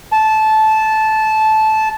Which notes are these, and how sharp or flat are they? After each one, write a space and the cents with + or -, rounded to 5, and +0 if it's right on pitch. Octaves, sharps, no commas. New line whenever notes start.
A5 -15